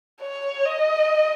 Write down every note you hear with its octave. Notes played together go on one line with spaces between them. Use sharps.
C#5
D#5